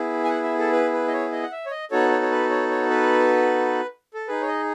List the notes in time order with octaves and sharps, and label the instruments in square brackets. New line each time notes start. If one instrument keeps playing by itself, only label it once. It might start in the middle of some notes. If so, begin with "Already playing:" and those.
Already playing: [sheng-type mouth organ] B3 E4 G#4
G#5
F#5
E5
A4
B4
B4
D#5
C#5
D#5
F#5
E5
C#5
D#5
B3 D#4 F#4 A4 C#5
C#5
C#5
B4
C#5
C#5
B4
A4
D#4 G#4 B4
C#5
D#5